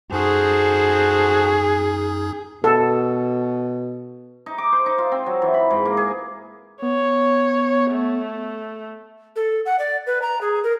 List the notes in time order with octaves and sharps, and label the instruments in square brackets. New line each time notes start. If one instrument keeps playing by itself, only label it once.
[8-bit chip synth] F#2 D#4 D#6 [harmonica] F#4 A4 C5 [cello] G#4
[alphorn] B2 [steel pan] A4
[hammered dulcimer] D#4
D6
C5
D#4
F4
C4
F#3
E3
B5
G#2
A#3
G#4
[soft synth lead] B3 [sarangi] C#5
[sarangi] A3
[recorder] A4
F#5
D5
B4
A#5
G#4
A#4